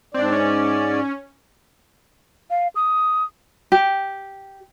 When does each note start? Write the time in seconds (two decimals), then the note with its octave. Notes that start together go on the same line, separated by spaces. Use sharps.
0.14 G#2 C4 D4 D5
0.32 C#4
2.50 F5
2.75 D#6
3.72 G4